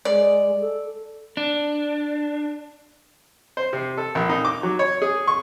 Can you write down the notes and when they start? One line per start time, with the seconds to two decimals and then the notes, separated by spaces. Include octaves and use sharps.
0.05 G#3 D5
0.60 A4
1.37 D4
3.57 C5
3.73 C3
3.98 A4
4.15 A#1
4.29 D#4
4.45 D6
4.63 F#3
4.79 C#5
5.02 G#4
5.27 C#6